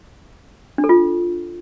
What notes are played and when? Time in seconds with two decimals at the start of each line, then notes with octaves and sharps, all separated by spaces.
0.78 D4
0.84 A4
0.89 F4